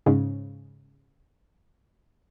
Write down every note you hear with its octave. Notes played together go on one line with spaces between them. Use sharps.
G#2 C#3